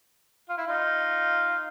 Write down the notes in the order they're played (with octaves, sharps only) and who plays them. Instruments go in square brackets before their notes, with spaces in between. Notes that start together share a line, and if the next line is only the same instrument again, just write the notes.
[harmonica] F4
E4
D#4 F4